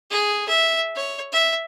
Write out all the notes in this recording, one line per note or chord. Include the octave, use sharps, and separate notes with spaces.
G#4
E5
C#5
E5